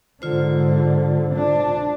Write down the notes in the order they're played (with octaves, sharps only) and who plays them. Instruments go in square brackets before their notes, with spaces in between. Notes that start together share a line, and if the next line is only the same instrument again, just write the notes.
[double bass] G#2 D3 [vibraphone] F4 C5
[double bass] D4